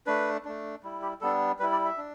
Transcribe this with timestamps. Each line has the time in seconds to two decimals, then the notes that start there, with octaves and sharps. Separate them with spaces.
0.07 A3 D4 B4
0.45 A3 D4
0.83 G3 E4
1.02 G4
1.21 G3 B3 D4 A4
1.59 G3 B4
1.63 E4
1.72 D5
1.85 E5
1.98 D4